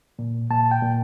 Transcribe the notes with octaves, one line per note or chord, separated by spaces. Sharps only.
A#2
A#2 A5
G5
A#2